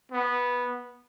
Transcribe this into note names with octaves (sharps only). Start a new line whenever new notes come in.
B3